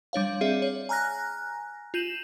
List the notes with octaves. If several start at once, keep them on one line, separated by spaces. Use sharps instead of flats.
G3 D4 C#5 F5
C4 G#4 D5 E5
C#5
G#5 A#5 F6 F#6 A#6
F4 G6 D#7 E7 F#7